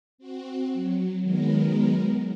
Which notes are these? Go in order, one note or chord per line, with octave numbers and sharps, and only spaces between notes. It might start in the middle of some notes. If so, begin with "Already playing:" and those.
C4 F#4
F#3
D#3 F#3 G#3 B3 A#4